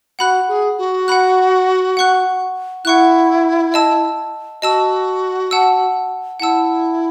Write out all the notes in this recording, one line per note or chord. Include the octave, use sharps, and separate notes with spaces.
F#4 F#5 B5 F#6
G#4
F#4
F#5 B5 F#6
F#5 C#6 F#6
E4 F#5 C#6 F#6
D#5 A5 E6
F#4 D#5 A5 E6
F#5 A5 E6
E4 F#5 A5 E6